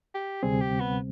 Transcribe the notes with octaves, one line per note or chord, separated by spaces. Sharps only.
G4
D2 C3 G3 C4 G#4
G4
B3